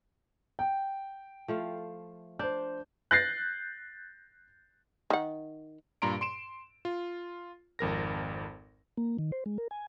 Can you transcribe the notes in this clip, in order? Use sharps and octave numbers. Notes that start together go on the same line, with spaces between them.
G5
F3 A3 F5
D4 C5 G6
F#6 G6 A6 A#6 C7
D#3 F#5
G2 A#2 A#5 C6 D7
C6 D7 E7
F4
G#1 F2 A#4 A#6
A#3
D#3
C5
G#3
A#4
G#5